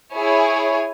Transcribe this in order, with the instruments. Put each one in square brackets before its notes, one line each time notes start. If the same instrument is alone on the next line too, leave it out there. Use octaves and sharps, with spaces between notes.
[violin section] E4 G#4 C#5 G#5